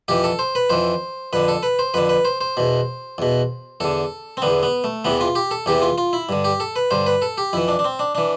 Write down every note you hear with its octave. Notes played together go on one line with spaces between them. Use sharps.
F2 E3 G4
A4
C5
B4
F2 E3 C5
F2 D3 B4
A4
B4
C5
F2 D3 B4
B4
C5
C5
E2 B2
E2 B2
E2 D3 A4
C4
E2 D3 B3
B3
A3
E2 C3 E3 B3
F4
G4
A4
E2 C3 E3 G4
F4
F4
E4
G2 D3
G4
A4
B4
G2 D3 C5
B4
A4
G4
F2 E3 E4
D4
D4
C4
D4
E3 D4